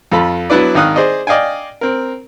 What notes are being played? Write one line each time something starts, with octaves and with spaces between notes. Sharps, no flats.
F2 F4 A4 B5
F#3 B3 D4 E4 B4 D5
G#1 D#3 D#4 F5 D#6 F#6
G#4 C5 D5 D#5
D5 D#5 F5 G5 G#5
C4 A#4